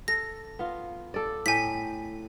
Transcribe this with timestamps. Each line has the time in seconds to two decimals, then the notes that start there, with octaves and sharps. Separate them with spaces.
0.08 A4 A#6
0.59 B3 F4
1.14 A4 D5
1.46 A2 G5 G#5 B6